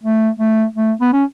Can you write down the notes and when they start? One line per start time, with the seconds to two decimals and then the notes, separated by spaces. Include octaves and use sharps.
0.04 A3
0.40 A3
0.76 A3
1.01 B3
1.13 C#4